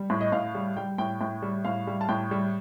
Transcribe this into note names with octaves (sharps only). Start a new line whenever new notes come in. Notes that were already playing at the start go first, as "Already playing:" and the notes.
Already playing: G3
A2
D#5
A2 F5
G3
G3 G5
A2 G5
A2 G5
G3
A2 F5
G3
A5
A2 G5
G3